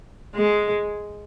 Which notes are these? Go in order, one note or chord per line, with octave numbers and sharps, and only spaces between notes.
G#3